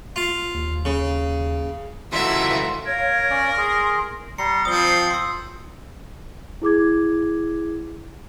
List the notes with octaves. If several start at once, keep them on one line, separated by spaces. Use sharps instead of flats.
F4
D#2
C#3
C#2 E3 F4 F#4 A4 E5 A#5 C6
A#4 C#5 F5 G#6
C#4 D5
G#4 C6
G3 A#5 C6 C#7
F3 C4 D#6 G7
C7
C6 E6
E4 G#4 D6 G#6